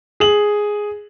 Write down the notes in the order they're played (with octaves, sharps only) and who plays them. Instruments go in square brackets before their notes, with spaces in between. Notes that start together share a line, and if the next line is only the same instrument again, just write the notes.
[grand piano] G#4 F#7